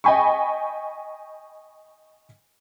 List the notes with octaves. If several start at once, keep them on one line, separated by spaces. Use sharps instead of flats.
D#5 G5 G#5 B5 C#6